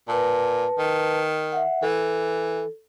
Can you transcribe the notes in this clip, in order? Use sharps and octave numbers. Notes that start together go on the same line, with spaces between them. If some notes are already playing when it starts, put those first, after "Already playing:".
A#2 B4 A5
D#3
E5 F#5
E3 A4